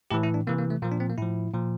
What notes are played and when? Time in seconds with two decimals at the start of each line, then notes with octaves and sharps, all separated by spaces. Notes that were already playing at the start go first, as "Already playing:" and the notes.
0.11 A2 E3 G4
0.23 E4
0.34 D4
0.47 C3 E3 A#3
0.58 A#3
0.70 A3
0.82 A#2 F3 A#3
0.91 D4
1.00 C4
1.10 A#3
1.18 A2 F3 E4
1.54 A#2 F3